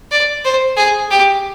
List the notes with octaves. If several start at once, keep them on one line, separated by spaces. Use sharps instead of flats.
D5
C5
G#4
G4